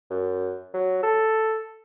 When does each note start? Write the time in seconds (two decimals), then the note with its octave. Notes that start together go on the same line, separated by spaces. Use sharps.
0.11 F#2
0.74 F#3
1.03 A4